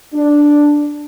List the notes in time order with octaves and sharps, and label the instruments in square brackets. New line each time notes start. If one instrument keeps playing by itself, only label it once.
[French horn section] D4